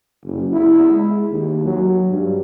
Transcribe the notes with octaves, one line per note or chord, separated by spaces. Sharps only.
F#1
E4
G#3
D#2
F#3
G2